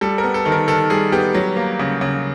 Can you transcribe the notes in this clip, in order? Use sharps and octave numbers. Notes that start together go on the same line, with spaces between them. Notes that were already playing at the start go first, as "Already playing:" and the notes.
G3 A4
A#4
B3
A4
D#3 A4
A#4
D#3 A4
G3 G#4
B3 G4
F#3
A#3
C#3
C#3